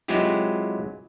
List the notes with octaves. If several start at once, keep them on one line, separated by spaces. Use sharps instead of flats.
F#3 G#3 C4 E4 F4 G4